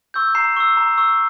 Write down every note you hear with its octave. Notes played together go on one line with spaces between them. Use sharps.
C#6 E6 G6
A#5 C7
C#6 E6
A#5
C#6 E6